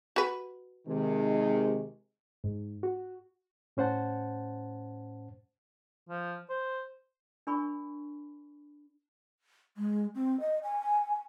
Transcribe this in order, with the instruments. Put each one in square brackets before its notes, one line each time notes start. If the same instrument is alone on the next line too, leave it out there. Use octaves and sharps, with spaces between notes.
[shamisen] F#4 B4
[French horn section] C3 D#3 G#3
[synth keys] G#2
F#4
[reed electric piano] A2 C#4 C5 F#5 A5
[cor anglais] F3
C5
[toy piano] D4 A#4 D5 G#5 B5 C#6
[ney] G#3
C4
D#5
G#5